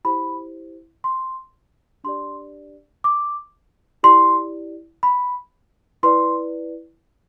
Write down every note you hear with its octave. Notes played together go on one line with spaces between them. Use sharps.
E4 G4 C5 B5
C6
D4 G4 D5 C6
D6
E4 G4 D5 C6
B5
E4 B4 D5 C6